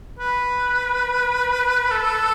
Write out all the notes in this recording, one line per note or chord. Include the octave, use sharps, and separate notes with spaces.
B4
A4